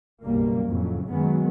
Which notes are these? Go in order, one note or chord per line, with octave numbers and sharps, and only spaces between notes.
F#1 B1 B2 G3 A#3
F2 A2 C#3 F#3
F#2 D#3 F#3 G#3 B3